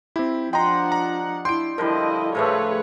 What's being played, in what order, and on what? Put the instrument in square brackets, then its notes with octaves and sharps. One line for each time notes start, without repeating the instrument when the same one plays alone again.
[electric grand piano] C4 E4 [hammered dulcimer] G4
[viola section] F3 D4 F#5 [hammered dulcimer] D#5 C6 [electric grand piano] G5 A#5
[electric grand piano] A#5
[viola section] D4 E4 [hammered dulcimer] G5 [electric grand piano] C6 D7
[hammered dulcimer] D3 F3 G3 [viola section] E4 D#5 [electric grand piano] A#4
[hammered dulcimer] A2 F3 A3 [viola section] G#4 B4 C#5